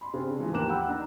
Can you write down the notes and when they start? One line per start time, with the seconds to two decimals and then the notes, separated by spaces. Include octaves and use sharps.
0.01 B5 C6
0.13 C#3 C4 D4 G#4
0.38 G#2 E3 F3
0.53 D#2 A#3 A#4 D6 F#6 E7
0.68 F#5 G5 B5 E6
0.88 D4 D#4 A#5